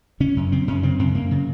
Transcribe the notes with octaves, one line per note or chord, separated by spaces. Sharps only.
C#3 C#4
F#2
C#3 C4
F#2 C#4
C#3 C4
F#2 C4
F#2 A#3
C#3